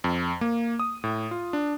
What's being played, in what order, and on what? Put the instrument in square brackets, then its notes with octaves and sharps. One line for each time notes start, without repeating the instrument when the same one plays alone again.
[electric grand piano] F2
A#3
D#6
A2
F4
D4